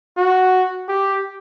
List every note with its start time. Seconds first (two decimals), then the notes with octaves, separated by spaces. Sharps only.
0.17 F#4
0.88 G4